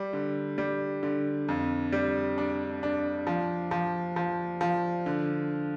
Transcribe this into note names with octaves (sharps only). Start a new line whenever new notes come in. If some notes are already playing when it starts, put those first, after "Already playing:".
Already playing: G3
D3
G3
D3
F2
G3
D4
D4
F3
F3
F3
F3
D3